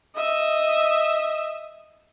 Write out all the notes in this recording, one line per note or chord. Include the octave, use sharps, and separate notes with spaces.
D#5 E5